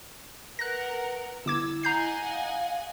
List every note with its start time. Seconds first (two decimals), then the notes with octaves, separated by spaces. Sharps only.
0.59 A#4 B4 F#5 F#6 A#6
1.46 G1 E4 D6 E6 G#6
1.83 D#5 F#5 G#5 A#5 G6 C7
2.28 F5